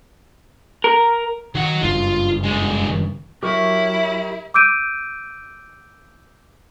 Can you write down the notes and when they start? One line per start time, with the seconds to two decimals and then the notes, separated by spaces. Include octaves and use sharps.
0.84 A#4
1.55 D#3 F#3 F#5
1.83 F#1 G2 F4
2.44 E2 G#3
3.43 F#3 E4 G4 A#4 C#6
4.54 D6 E6 G6 D7 D#7